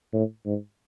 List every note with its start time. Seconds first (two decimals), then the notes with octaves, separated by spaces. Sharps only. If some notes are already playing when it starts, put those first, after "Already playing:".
0.13 A2
0.46 G#2